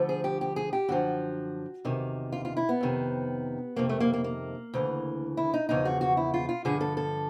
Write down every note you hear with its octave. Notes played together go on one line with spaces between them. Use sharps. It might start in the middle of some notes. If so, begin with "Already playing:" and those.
Already playing: D2 D3 F3
G#4
G4
G4
G#4
G4
F#2 D3 F3 F#4
E2 C3 D#3
F4
F4
E4
B3
F2 C3 D#3
F2 C3 D#3 A#3
A3
A#3
A#3
A#3
D2 C#3 E3
E4
D#4
E2 C#3 F3 D#4
F#4
F#4
E4
F4
F4
G2 D3 F3 G#4
A4
A4